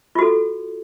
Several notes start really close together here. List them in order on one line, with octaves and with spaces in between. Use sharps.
F4 F#4 A4